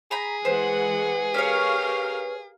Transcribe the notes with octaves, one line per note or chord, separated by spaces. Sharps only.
G#4 A#5 B5
E3 G#3 B4 C5 F#5
C#4 G4 A#4 C#5 F5